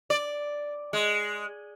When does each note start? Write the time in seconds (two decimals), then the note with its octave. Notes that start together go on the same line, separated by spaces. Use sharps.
0.10 D5
0.93 G#3